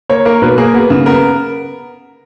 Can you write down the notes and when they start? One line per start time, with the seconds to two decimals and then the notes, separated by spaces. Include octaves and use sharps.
0.09 A#3 C#5
0.25 A#3 A#4
0.42 B2 B4
0.58 A#3 G#4
0.74 B3
0.90 C#3
1.06 B3 A#4